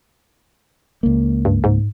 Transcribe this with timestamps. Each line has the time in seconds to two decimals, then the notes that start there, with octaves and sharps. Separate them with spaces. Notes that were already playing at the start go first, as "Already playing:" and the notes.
1.03 C#2 A#3
1.45 G2
1.64 G#2